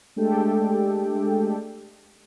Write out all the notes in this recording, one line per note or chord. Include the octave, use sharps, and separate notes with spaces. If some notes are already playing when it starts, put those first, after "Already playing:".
G#3 A3 D4 G4 A4 G5